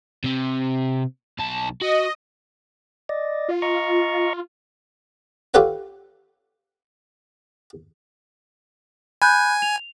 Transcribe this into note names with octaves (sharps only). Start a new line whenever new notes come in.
C3 C4
B1 A5
F#4 D#5
D5 D#5
F4
D#5 A#5 C#6
F4 G4 A4 B4 C#5 F#5
G#5 B5 F#6 G6
F7